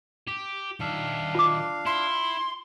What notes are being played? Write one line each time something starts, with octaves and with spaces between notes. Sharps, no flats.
G4
D#3 D4 E5 F5
F4 D6
E4 C6